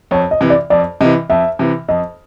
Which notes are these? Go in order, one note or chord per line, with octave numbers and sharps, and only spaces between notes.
F2 C#5
D#5
C3 E3
D5
F2 D5
C3 E3 D#5
F2 E5
C3 E3
F2 D#5